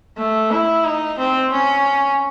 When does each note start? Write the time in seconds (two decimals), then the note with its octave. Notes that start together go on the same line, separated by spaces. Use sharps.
0.18 A3
0.51 E4
0.84 D#4
1.18 C4
1.52 C#4